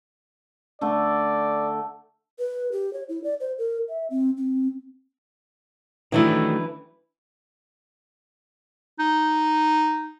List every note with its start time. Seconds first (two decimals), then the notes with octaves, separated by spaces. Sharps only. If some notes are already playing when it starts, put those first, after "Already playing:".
0.81 D3 A3 D5
2.39 B4
2.72 G4
2.93 C#5
3.09 E4
3.24 D5
3.40 C5
3.58 A#4
3.89 E5
4.10 C4
4.37 C4
6.12 D#3 E3 F#3 A3 D4 E4
8.99 D#4